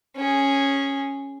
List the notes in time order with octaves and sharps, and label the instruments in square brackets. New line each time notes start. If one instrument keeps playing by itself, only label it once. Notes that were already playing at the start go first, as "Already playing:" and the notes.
[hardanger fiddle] C#4 G#4